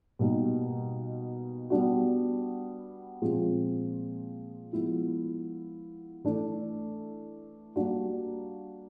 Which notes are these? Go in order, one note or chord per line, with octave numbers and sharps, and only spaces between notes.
B2 G3 A#3 D#4
G3 B3 D4 F#4
A#2 F3 G#3 C4
F3 G#3 B3 E4
E3 A3 D4
G3 A#3 D4 F#4